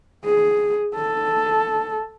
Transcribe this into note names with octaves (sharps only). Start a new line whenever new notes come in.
G#4
A4